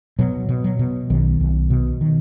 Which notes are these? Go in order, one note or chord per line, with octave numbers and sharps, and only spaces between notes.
B2 F#3
B2
F#3
B2
B1 D#3
B1
B2
D#3